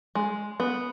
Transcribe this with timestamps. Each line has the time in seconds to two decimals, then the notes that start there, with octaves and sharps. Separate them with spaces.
0.15 G#3
0.60 B3